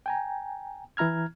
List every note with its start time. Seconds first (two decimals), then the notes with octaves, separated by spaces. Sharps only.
0.06 G5 G#5 A#5
0.97 E3 E4 A#5 F6 G#6